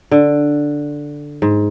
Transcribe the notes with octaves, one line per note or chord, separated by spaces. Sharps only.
D3
G#2